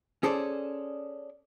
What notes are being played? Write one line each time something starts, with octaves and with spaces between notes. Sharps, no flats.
C#4 G#4 A4 C5 D5